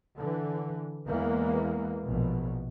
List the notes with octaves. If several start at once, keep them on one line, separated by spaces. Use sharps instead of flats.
D3 E3
E2 E3 G#3 A#3
A#1 B2